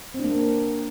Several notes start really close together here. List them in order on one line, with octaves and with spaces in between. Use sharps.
C4 D4 A#3